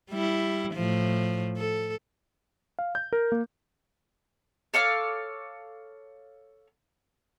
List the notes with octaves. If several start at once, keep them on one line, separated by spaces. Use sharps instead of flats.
G3 E4
A2 F3
A4
F5
G6
A#4
A#3
A4 C#5 F5 D6